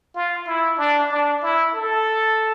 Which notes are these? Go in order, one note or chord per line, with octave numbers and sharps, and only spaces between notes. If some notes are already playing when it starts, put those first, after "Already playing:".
F4
E4
D4
D4
E4
A4